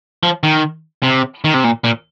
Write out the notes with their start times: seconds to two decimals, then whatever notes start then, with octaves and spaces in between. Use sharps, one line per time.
0.23 F3
0.43 D#3
1.03 C3
1.45 D#3
1.54 C3
1.64 A#2
1.84 A#2